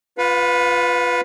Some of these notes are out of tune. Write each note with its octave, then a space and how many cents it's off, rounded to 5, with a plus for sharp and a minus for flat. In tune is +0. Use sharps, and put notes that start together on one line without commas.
F4 +0 B4 +5 F5 +45